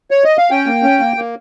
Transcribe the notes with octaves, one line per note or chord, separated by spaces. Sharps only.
C#5
D#5
F5
C#4 G5
A#3
C#4
A#3
A#3